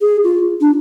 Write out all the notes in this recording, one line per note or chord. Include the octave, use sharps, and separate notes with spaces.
G#4
F4
D4